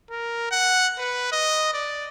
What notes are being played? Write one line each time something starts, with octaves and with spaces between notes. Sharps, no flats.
A#4
F#5
B4
D#5
D5